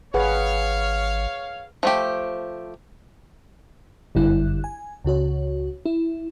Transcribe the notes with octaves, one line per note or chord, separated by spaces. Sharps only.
G#1 G#4 B4 C#5 F5 F#5
F3 A3 G4
G1 F#2 D3 G3 E4 F#6
G#5
C#2 C#3 F#4 C#5
E4